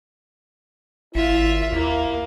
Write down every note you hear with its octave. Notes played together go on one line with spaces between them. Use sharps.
G#1 E4 F4 E5
D#2 A#3